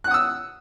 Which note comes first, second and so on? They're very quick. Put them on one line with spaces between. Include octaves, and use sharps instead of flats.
F#6 F#5 D#6 E6